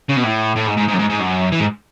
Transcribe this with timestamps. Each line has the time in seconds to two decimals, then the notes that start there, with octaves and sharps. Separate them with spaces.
0.09 C#3
0.16 B2
0.23 A2
0.56 A2
0.66 G#2
0.77 G#2
0.88 G#2
0.93 F#2
0.99 G#2
1.10 G#2
1.20 F#2
1.52 E3
1.60 G#2